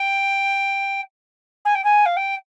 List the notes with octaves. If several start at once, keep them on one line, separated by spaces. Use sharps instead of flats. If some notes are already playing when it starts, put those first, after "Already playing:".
Already playing: G5
G#5
G5
G#5
F5
G5